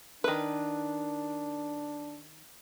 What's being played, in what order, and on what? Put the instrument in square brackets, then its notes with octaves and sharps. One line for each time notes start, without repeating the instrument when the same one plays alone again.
[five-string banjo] D#3 B4 [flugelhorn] D4